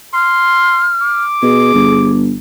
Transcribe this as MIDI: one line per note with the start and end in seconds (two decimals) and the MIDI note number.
0.14 0.92 84
0.14 1.23 89
1.02 2.22 86
1.42 1.74 47
1.42 2.09 68
1.74 2.36 31